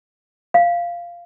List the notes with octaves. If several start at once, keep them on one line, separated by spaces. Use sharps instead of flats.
F5